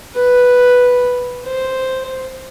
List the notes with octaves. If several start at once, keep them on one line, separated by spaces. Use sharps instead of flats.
B4
C5